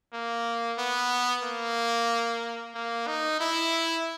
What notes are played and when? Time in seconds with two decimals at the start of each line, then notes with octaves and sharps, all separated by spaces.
0.14 A#3
0.79 B3
1.44 A#3
2.75 A#3
3.07 D#4
3.40 E4